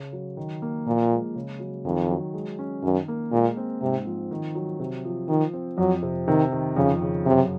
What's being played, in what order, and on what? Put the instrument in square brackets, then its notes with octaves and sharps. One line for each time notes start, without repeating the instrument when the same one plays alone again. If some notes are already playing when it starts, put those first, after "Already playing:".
Already playing: [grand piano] C#3
F#3
D#3
A#3
[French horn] A#2 [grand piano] F3
[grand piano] G#3
C#3
F#3
[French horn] F2 [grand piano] D#3
[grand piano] F#3
G#3
C#4
[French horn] F#2 [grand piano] D#3
[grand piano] A#3
[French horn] A#2 [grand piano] G#3
[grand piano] C4
[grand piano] G#2 [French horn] C3
[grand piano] F3
D#3
F#3
C3
F3
[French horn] D#3 [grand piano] F3
[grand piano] C4
[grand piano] F2 [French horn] F#3
[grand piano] C3
[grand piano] C3 [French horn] D#3
[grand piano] D#3
[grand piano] F2 [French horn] C#3
[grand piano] C#3
[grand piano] F#2 [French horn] C3